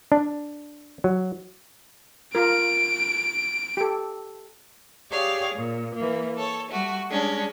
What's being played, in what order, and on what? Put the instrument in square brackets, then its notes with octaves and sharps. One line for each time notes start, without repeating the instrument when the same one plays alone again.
[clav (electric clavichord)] D4
F#3
[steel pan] F4 A#4 [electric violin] D7
[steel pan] G4 A4
[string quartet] G4 G#4 C#5 D5 F5
A#2
E3 A#3
A4 C#5
G3 A3 F#4
G3 G#3 C#4 D4